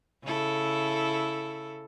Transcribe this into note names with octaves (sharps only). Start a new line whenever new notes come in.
C#3 E4 A4